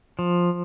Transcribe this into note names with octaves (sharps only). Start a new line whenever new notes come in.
F3